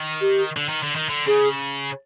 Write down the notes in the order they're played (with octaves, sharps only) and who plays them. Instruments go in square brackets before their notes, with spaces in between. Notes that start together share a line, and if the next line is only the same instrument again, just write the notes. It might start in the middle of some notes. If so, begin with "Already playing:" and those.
Already playing: [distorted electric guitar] D#3
[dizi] G4
[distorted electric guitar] D3
D#3
D3
D#3
D3
[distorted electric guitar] C#3 [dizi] G#4